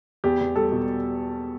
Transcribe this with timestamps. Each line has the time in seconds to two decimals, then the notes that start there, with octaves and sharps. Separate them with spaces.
0.24 E2 G4
0.40 E2
0.56 G3 A4
0.72 B2